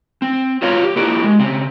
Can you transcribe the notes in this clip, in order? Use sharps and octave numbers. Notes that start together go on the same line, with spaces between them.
C4
F4 F#4 A#4 C#5 F5
G4
A#3 E4 F#4 G4 A#4
G#3
C#3 C4